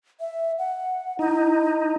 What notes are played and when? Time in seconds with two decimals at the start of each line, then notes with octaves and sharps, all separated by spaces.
0.20 E5
0.59 F#5
1.19 D#4 E4